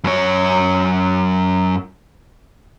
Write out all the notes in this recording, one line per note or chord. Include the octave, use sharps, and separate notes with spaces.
F#2 C#5